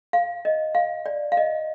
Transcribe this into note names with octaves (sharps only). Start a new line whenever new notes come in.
F5
D#5
F5
D5
F5
D#5